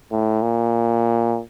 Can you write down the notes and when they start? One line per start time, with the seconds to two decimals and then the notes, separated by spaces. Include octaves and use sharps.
0.11 A2
0.42 A#2